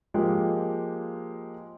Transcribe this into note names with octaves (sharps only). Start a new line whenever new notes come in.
F3 G#3 A#3 G4